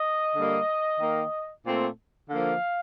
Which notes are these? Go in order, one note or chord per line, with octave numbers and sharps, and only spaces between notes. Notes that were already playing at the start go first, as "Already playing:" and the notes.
Already playing: D#5
D3 G3 A#3
D#3 A#3
A#2 A3 C4
D3 F3 A#3 F5